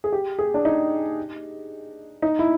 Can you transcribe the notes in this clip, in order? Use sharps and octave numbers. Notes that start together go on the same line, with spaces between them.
G#4
G4
G#4
D4
D#4
D#4
E4